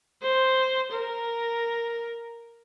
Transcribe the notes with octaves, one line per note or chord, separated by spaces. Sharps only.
C5
A#4